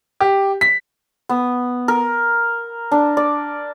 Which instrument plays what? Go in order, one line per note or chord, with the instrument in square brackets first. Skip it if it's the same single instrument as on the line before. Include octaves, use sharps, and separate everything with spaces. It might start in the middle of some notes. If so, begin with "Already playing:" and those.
[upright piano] G4
B6
[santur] B3
A#4
D4
D5